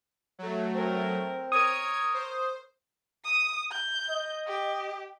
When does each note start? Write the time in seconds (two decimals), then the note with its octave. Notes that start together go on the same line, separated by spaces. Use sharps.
0.39 F#3 A3
0.75 C4 A#4
1.52 A#4 C#5 D#6 G#6
2.14 C5
3.24 D#6
3.72 G6
4.10 D#5
4.47 G4